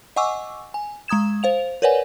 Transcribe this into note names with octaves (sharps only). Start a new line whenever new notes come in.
D#5 F#5 G#5 C#6 D6 E6
G#5
G#3 A#5 D#6 G#6 E7
C5 F5 F7
A#4 B4 C#5 D5 F#5 G#5